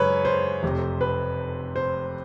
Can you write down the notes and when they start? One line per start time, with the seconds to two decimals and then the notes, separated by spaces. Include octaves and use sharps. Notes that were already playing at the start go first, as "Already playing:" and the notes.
Already playing: F#2 C#3 G#3 C#4 B4 C#5
0.25 C5
0.63 F1 F2 C3
1.01 B4
1.76 C5